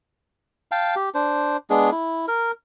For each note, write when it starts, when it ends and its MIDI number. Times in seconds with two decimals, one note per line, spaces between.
0.72 0.95 77
0.72 0.95 79
0.72 0.95 81
0.96 1.09 67
1.14 1.57 62
1.14 1.57 72
1.70 1.90 56
1.70 1.90 59
1.70 1.90 62
1.70 1.90 68
1.91 2.26 64
2.28 2.51 70